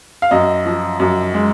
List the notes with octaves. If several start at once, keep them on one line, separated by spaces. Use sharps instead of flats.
F5
F#2 D#5
F3
F#2
G#3